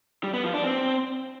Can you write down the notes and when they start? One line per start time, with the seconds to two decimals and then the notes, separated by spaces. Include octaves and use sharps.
0.24 G3
0.34 B3
0.44 F3
0.54 D4
0.64 C4